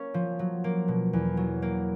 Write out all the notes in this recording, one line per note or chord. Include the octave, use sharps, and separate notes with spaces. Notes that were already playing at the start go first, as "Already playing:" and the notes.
Already playing: A#3 C#4
F3
F#3
A#3
B2
E2
F#3
A#3